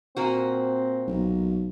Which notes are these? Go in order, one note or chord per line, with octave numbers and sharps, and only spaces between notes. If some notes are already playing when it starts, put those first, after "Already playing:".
A#2 A#3 C4 F#4
B1